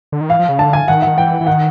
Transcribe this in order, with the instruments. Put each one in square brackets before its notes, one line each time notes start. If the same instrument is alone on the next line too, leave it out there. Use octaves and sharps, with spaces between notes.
[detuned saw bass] D3
D#3
[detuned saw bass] E3 [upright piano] F5
[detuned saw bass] F3
C#3
[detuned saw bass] D3 [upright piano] A5
[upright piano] G#5
[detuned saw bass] D#3 [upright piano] F#5
[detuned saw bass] D#3 [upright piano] F#5
[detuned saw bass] E3 [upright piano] G5
[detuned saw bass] E3
[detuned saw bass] D#3 [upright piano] F#5